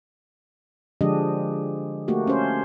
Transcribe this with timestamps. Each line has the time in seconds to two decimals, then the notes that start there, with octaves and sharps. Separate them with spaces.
1.01 D3 F3 G#3 D4 G4 D#5
2.08 A3 A#3 F#4 G4
2.27 C#4 C5